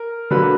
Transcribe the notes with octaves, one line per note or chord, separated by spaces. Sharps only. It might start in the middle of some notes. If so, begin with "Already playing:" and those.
Already playing: A#4
D3 F#3 A#3 B4